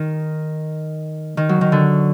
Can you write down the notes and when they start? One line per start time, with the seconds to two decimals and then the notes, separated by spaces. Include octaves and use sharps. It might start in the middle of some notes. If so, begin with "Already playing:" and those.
Already playing: D#3
1.37 D#3
1.49 F#3
1.61 D#3
1.72 D3